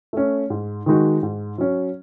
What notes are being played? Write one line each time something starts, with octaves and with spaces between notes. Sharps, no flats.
A3 C#4
G#2
D#3 G#3 D#4 F#4
G#2
F#3 C#4